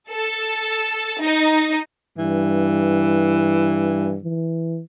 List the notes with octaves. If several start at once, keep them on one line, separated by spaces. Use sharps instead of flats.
A4
D#4
G2 E3
E3